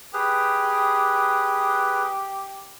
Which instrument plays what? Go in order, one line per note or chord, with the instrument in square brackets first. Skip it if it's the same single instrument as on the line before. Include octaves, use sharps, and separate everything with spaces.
[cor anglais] G4 [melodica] G#4 B4